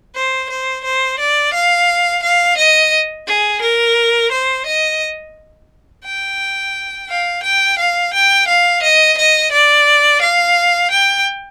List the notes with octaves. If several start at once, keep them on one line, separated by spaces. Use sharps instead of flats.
C5
C5
C5
D5
F5
F5
D#5
G#4
A#4
C5
D#5
G5
F5
G5
F5
G5
F5
D#5
D#5
D5
F5
G5